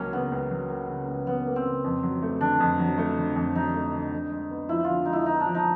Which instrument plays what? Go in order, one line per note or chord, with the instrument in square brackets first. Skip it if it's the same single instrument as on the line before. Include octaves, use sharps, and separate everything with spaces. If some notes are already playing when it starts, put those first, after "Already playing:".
Already playing: [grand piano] C#2 F#3 A#3 [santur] C#4
[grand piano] C#3 [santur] B3
[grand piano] C#2
F#3
A#3
C#3
C#2
[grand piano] F#3 [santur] B3
[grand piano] A#3
[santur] C4
[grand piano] C#3
F2
F#3
A3
[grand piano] D3 [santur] D4
[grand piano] F2
F#3
A3
D3
F2
[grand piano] F#3 [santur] D#4
[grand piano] A3
D3
D3
G#3
B3
[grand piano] F3 [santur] E4
[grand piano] D3 [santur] F4
[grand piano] G#3 [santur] D#4
[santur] E4
[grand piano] B3 [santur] D#4
[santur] D4
[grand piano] F3
[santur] D#4